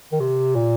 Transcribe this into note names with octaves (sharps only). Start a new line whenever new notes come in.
D#3
C3
A#2